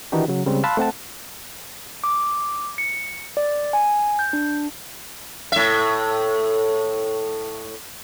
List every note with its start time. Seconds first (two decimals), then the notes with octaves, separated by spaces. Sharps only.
0.12 D#3 E3 D4 D#4 F#4 G4
0.28 C#3 F#3
0.46 C#3 G3 G#3 C4
0.64 F5 A5 B5 C6 E6 F#6
0.77 A3 C4 F#5 A5
2.04 D6
2.78 C#7
3.37 D5
3.73 G#5
4.19 G6
4.33 D4
5.52 A2 E5